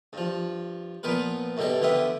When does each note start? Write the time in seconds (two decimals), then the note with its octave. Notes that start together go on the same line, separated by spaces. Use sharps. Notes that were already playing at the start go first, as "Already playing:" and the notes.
0.13 G2 F3
1.03 A#2 F3 B3 A#4 B4
1.57 F#2 B2 D3 G3 A5
1.81 D2 D3 B3 F4 G4 E5